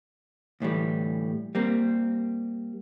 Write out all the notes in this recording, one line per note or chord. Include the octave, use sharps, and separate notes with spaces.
D2 A2 E3 G3
G3 A#3 C4